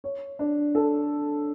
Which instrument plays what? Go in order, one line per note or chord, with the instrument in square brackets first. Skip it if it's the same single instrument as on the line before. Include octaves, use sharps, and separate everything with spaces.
[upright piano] C#5
D4
A4